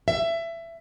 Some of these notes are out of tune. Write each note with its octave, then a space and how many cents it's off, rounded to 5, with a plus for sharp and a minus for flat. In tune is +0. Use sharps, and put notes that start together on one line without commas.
E5 +20